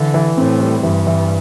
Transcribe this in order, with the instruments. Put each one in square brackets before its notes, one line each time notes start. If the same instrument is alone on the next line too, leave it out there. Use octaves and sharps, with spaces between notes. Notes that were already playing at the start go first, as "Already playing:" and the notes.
Already playing: [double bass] D3 [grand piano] E3
[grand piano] E3
[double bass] A2 [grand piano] C4
[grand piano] G3
[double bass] G2 [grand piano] E3
[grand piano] E3